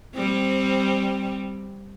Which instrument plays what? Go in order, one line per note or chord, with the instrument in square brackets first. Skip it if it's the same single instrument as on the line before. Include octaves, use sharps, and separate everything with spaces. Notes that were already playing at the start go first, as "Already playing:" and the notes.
[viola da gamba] G3 C4